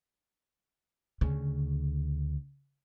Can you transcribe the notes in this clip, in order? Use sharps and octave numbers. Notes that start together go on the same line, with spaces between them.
D2 C#3